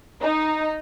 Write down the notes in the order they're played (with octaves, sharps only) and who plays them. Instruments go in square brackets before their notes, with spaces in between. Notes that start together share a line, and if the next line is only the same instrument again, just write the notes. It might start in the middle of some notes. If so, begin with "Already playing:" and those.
[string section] D#4